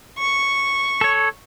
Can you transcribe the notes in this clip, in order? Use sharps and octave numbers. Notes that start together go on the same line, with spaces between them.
C#6
A4 C#5